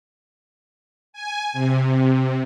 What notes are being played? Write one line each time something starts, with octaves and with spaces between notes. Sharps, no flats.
G#5
C3